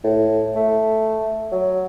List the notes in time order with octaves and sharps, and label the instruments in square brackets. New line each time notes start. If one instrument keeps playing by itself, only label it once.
[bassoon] A2
A3
F#3